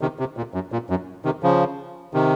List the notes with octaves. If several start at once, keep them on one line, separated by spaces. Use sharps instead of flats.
C3 D#3
C3
A#2
F#2
A#2
F#2
C3 D#3
C#3 F3
C3 D#3